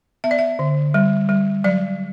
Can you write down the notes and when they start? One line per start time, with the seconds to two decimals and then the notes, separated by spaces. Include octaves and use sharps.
0.24 B3 E5
0.31 D5
0.39 E5
0.59 D3
0.94 G3
1.29 G3
1.64 F#3 D5